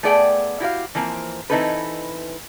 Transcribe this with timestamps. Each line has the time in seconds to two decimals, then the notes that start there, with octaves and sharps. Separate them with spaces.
0.03 A3 B3 G#4 D5 F#5 G5
0.60 E4 F#4 G4 F5
0.95 E3 F3 A#3 C4
1.50 E3 C4 D#4 E4 A4 B4